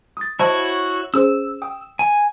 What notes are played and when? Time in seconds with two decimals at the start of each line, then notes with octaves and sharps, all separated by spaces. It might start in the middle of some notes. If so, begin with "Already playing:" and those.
0.17 D#6 A6
0.39 E4 F#4 C5 C#5 D#5 A5
1.14 C#4 G#4 C5 E6
1.62 G5 D#6
1.99 G#5